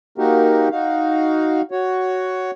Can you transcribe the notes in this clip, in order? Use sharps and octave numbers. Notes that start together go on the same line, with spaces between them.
A#3 D#4 F#4 G4 A#4
D#4 F#4 F5
F#4 C#5